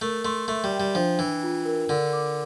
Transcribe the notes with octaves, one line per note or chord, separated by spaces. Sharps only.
A3 A#4
A3 C6
A3 E5
G3
G5
G3
F3 D4
E3 D4
F4
A#4
D3 A#4
D6